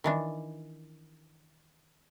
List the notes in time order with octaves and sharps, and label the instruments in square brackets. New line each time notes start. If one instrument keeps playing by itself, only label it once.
[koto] D#3 E3 D4